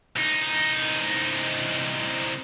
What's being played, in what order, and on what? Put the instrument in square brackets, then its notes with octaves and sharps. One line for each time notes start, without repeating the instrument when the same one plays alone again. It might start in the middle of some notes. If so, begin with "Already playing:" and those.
[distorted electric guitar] C2 D#4